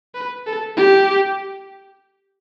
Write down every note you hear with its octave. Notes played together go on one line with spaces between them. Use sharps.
B4
A4
G4